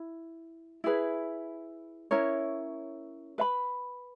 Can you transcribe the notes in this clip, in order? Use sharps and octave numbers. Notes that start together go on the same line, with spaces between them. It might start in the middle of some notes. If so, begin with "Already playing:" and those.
Already playing: E4
E4 G#4 B4
C#4 E4 A#4 C#5
B4 E5 B5